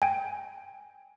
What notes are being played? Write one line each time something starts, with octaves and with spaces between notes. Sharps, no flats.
G5 G#5